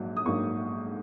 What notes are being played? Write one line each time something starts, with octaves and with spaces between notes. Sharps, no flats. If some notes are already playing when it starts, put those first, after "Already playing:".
Already playing: A#1 G#2 F#3 A#3
D#6
A#1 G#2 F#3 A#3 C#6